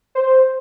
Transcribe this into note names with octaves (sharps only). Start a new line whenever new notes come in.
C5